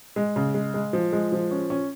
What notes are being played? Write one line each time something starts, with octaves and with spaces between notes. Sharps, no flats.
G#3
C#3
G#3
G#3
F3
G#3
F3
C#4
C#4